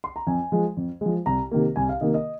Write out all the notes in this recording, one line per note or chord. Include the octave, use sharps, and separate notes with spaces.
C6
A#5
F2 G#5
F3 G#3
F2
F3 G#3
C2 A#5
C3 D#3 A#3
C2 G#5
F5
C3 D#3 A#3 D#5
D#5